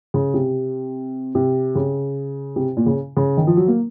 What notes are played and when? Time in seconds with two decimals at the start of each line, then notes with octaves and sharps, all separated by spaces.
0.14 C#3
0.34 C3
1.35 C3
1.75 C#3
2.56 C3
2.77 A#2
2.86 C#3
3.17 C#3
3.37 D#3
3.47 F3
3.57 F#3
3.68 A#3